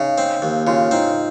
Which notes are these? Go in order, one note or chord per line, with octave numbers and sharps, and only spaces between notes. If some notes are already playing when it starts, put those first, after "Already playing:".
Already playing: C#3 D#4
C4
D#2
C#3 F4
C4 D#4